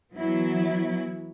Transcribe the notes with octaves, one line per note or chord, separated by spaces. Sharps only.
E3 F#3 B3 E4